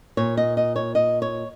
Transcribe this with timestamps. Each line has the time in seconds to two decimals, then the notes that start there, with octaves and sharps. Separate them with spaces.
0.17 A#2 C#5
0.37 D#5
0.57 D#5
0.76 C#5
0.95 D#5
1.22 C#5